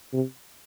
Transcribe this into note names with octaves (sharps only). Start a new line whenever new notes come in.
C3